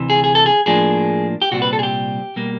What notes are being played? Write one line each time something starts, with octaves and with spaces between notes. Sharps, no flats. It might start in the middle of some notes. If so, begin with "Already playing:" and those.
Already playing: D2 C3 E3
G#4
G#4
A4
G#4
A2 F3 A#3 D4 G#4
G4
C2 A#2 G3 C4 F#4
B4
A4
G#4
G4
B2 G3 A#3